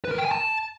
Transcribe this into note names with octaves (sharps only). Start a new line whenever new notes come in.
B4
A#4
G5
G#5
A5